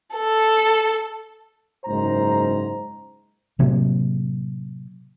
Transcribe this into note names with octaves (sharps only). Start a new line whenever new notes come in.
A4
F#1 G#2 C5 A#5
A2 C3 F#3 A#3